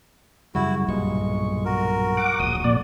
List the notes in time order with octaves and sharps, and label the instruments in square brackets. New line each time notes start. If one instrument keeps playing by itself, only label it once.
[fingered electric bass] F#2 C#3 G3 [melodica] E4 F#4
[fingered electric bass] B1 G2 A#2 [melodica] G#3 C#6
[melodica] F#4 A#4
[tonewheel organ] F#5 D6
[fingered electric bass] D1 A#1 [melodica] F#4 [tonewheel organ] D#6
[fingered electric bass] F2 [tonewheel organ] A#2 D5